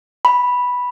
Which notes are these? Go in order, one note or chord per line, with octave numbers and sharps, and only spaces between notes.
B5